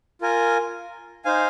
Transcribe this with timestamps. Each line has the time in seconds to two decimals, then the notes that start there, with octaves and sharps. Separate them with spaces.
0.21 F4 A#4 G#5
1.25 D#4 C5 F5 G#5